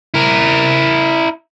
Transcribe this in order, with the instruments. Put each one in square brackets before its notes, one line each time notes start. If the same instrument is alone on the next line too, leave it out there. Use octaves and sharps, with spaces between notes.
[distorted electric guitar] E4 A#4